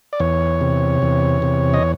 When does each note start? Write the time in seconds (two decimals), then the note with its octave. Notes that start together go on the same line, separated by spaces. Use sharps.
0.13 D5
0.20 E2 C#5
0.61 C3
1.02 E2
1.42 C3
1.74 D#5